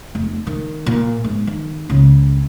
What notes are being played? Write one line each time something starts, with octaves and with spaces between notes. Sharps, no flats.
F1
D#3
A#2
G#2
D#3
C#2 C#3